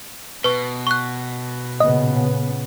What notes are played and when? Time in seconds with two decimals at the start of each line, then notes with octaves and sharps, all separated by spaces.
0.44 B2 B4 C#6
0.87 C#6 F#6
1.80 A#2 C#3 B3 D#5